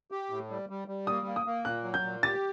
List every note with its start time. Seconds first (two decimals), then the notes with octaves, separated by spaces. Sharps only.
0.11 G4
0.30 A2
0.50 G3
0.69 G3
0.88 G3
1.07 A#3 D#6
1.27 A#3
1.36 D#6
1.46 A#3
1.65 A#2 F#6
1.84 F#3
1.94 G6
2.03 A#2
2.23 G4 A6